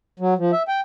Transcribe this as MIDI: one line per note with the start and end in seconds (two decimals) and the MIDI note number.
0.20 0.34 54
0.38 0.51 53
0.53 0.63 76
0.68 0.81 79